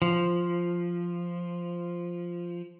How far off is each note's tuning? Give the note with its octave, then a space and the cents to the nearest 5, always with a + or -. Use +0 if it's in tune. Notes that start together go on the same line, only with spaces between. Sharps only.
F3 -5